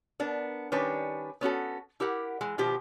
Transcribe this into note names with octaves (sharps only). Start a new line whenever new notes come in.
B3 D4 A#4
D#3 G3 C#4 D4 B4
B3 C#4 F#4 A4
E4 G4 A#4 F#5
E3 G#3
B2 D#3 F3 G4